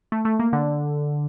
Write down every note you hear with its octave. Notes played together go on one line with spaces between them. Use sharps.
A3
A3
A#3
D3